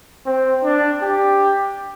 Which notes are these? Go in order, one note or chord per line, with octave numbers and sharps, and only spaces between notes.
C4
D4
G4